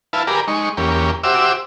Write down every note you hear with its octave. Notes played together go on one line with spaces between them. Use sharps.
E4 B4 F5 A5
G4 G#4 A#4 B4 D5 A#5
G#3 D#4 C#6
E2 A#3 C#4 G4
F#4 G4 C5 E5 D6 E6